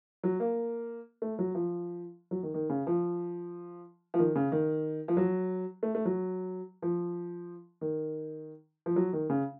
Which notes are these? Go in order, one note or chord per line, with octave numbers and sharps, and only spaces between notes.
F#3
A#3
A3
F#3
F3
F#3
D#3
D#3
C#3
F3
F3
D#3
C#3
D#3
F3
F#3
A3
A3
F#3
F3
D#3
F3
F#3
D#3
C#3